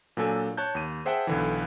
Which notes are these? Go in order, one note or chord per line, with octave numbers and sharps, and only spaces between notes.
A#2 F#3 D4 A4 G#5
C#5 A5 F#6 G6
D#2 D#7
G#4 C5 E5 F#5 G5 A5
B1 D3 E3